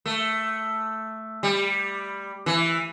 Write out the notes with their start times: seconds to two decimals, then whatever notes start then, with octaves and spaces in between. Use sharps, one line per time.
0.06 A3
1.43 G3
2.46 E3